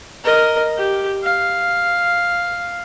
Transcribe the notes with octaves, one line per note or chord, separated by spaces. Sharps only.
A#4 D#5
G4
F5